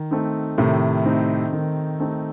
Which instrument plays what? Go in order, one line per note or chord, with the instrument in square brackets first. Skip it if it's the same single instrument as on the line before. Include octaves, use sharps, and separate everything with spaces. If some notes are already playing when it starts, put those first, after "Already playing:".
Already playing: [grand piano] D#3
A3 C4 D#4
[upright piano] A2 C3 [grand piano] D#3
[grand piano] A3 C4 D#4
D#3
A3 C4 D#4